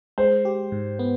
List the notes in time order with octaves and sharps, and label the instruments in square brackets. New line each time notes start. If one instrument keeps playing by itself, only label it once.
[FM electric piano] G#3 [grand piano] C5
[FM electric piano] G4
G#2
B3